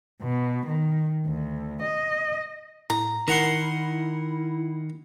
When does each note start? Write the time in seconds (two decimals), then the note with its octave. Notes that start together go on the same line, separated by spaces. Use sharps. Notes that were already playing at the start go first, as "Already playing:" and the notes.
0.22 B2
0.67 D#3
1.27 D2
1.83 D#5
2.90 A2 A#5
3.28 D#3 E4 A#4 F#5 C6